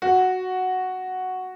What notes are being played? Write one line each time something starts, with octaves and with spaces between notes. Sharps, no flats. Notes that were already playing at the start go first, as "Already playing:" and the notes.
F#4